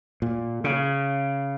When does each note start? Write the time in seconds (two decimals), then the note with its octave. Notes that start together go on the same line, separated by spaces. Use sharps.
0.22 A#2
0.64 C#3